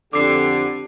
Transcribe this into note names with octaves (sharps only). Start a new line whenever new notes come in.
F2 D3 C4 G4 D6 C7